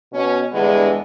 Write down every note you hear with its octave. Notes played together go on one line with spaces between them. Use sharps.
B2 C#4
E2 G2 D3 G#3 B3